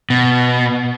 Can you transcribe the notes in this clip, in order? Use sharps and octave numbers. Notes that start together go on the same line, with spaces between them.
B2